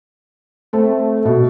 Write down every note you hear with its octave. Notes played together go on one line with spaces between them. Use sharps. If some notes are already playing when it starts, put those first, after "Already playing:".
A3 C4
B2